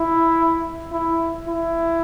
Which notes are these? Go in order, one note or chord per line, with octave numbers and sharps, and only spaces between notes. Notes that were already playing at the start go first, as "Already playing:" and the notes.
Already playing: E4
E4
E4